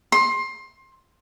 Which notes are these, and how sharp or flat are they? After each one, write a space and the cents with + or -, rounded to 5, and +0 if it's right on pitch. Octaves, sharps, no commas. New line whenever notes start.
C6 +20